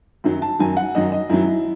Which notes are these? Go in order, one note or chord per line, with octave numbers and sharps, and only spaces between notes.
F#2 D#3 F#3
A5
F#2 D#3 F#3 G#5
F#5
F#2 D#3 F#3 D#5
D#5
F#2 D#3 F#3 E4